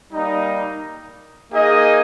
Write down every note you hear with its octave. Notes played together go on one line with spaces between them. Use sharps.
G3 A#3 D#4
A#3 D#4 G#4 D#5